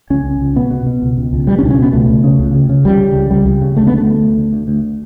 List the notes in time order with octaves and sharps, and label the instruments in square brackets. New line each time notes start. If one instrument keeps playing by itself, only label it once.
[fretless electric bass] C#2 C#4
C#2
C#2
B2 B3
B2
B2
C#2
C#2
C#2
B2 G3
C#4
C#2 D4
C#4
B2 B3
C#2 A3
C#2
C#3
C#2
C#3
C#3
C#2 G3
C#3
C#2
C#2 G3
C#2
C#3
D3 A3
B3
D2
A3
D3
D2
D2
D2
D2